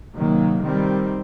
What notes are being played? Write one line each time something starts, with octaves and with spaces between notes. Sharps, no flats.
C3 D#3 F#3 A#3
D#3 G3 C4